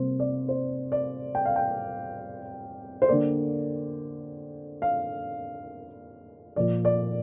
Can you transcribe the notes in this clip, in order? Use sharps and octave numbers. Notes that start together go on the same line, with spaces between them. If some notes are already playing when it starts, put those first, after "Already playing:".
Already playing: C3 G3 A#3 C5
D5
C5
D5
G5
F5
G5
C5
D3 A#3 D5
F5
A#2 F3 A#3 D5
D5